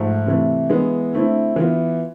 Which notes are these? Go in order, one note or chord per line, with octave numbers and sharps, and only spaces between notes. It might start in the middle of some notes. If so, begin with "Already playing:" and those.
Already playing: G#2 F3 A3
C3 E3 A3
E3 G#3 B3 E4
D3 A3 C4 E4
E3 B3 F4